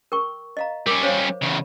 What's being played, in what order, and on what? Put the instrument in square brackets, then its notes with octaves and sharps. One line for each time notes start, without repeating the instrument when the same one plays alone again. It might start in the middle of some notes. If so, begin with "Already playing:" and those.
[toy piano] A#4 G5 C#6
D#5 F5 A#5
[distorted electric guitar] G3 C#4 [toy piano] A#4 D6
[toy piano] C5 C#5 F5
[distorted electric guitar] E2 C#3